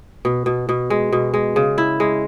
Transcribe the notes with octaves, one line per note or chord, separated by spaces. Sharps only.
B2
B2
B2
G#3
B2
G#3
C#3
E4
G#3